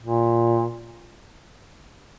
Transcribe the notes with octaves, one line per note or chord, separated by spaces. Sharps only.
A#2